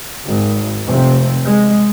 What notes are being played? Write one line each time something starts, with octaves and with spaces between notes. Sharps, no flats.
G#1
F1 C3 C4
G#3